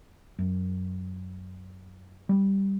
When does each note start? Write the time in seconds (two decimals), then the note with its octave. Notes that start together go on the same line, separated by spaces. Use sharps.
0.39 F#2
2.29 G3